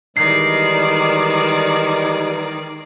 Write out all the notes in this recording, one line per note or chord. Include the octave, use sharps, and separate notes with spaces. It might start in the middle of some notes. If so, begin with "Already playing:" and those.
D#3 E3 G3 G#3 D5 C7